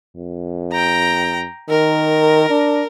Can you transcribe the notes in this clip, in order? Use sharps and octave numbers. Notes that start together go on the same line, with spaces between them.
F2
G5 A#5
D#3 A#4
D4